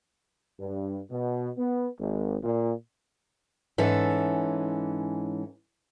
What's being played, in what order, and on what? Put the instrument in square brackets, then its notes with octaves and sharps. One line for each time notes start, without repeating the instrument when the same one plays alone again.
[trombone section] G2
B2
B3
G#1
A#2
[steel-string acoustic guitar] G#2 E3 C#4 A4